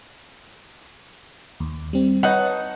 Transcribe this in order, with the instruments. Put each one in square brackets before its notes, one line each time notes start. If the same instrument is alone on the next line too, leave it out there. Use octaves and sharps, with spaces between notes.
[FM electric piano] D#2
G3 C4
[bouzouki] D#4 F#5 [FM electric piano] B4 C#5 A5